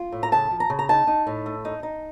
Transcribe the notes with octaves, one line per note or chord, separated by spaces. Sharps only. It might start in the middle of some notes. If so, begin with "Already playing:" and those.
Already playing: F4
A2
A#5
C#3 A5
F3
A#5
C#3
A#5
D#4 A5
D#4
A2
A3
D#4
D#4